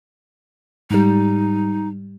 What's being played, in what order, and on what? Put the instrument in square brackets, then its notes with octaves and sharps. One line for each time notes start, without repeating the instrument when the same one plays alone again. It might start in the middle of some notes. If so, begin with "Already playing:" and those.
[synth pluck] G#2 G3 [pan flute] D#4